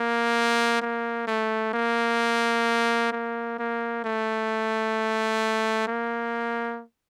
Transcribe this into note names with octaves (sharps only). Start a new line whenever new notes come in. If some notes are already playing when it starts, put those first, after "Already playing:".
Already playing: A#3
A#3
A3
A#3
A#3
A#3
A3
A#3